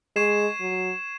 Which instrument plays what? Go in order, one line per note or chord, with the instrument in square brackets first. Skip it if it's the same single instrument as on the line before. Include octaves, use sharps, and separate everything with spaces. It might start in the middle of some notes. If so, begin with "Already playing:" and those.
[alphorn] G#3 [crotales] C#6 G#6 C7 E7
[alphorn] F#3